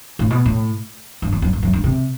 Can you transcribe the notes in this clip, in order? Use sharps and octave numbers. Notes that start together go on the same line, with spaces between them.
A2
B2
A2
G2
E2
F#2
G2
F#2
G2
C3